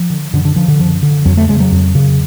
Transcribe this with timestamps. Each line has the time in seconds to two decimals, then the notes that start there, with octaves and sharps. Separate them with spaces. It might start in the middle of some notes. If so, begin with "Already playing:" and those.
Already playing: F3
0.10 D3
0.33 F#2 D3
0.45 D3
0.56 D3 F3
0.68 D3
0.79 F#2 F3
1.03 D3
1.25 F2 F#3
1.37 A3
1.49 C#3 G#3
1.60 F#3
1.72 F2
1.95 C#3